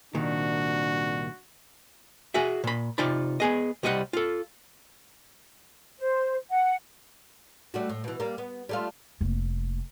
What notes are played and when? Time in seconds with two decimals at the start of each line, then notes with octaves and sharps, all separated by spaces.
0.14 C2 A#2 D#3 D4 F#4
2.34 F#4 G#4 E5
2.64 A#2 B5
2.98 C3 D#4 F4 D5 A5 B5
3.40 B3 G#4 D#5
3.83 C2 G3 D#5 E5 F#5
4.13 F4 A4
5.99 C5
6.50 F#5
7.74 G3 A3 F#4
7.89 A2
8.04 B2 E3
8.20 G3 A#3
8.38 B3
8.69 G3 A3 F4
9.21 F1 A#3